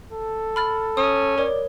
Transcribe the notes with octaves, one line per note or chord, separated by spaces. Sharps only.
A4
B5 F6 A6
C#4 D#6
A#4 C#5 D5